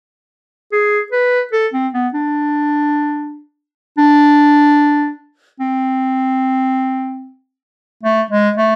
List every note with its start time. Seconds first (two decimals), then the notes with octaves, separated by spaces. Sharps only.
0.72 G#4
1.12 B4
1.53 A4
1.73 C4
1.94 B3
2.14 D4
3.97 D4
5.60 C4
8.03 A3
8.31 G#3
8.58 A3